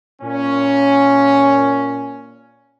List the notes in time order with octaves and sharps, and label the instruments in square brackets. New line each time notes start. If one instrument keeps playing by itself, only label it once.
[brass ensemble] A#2 C#4